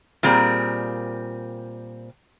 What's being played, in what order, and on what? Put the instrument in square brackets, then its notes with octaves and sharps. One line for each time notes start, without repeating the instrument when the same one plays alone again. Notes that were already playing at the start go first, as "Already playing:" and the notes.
[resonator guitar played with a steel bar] A#2 G3 C4 G#4 A#4 D5